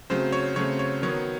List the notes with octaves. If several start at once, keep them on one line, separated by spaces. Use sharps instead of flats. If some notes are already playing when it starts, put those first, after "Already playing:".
C#3 F#3 A3 C4 C5
C#5
C#3 F#3 A3 C4 C#5
C#5
D#3 F#3 B3 C#5